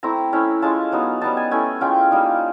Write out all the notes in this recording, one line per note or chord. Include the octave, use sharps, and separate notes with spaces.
A3 C4 E4 A#5
A3 C#4 E4
G#3 C#4 F4 A5
F#3 B3 D#4
G3 B3 D#4 A5
G#5
A3 C#4 E4 G#5
G#3 C#4 F4 G5
G3 A#3 D#4